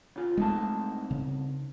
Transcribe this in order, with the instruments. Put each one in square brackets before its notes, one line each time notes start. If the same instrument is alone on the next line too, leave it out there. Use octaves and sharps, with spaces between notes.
[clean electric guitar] C#3 F4
[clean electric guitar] C2 D#4 A5 [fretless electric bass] G#3 A3
[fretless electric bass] C#3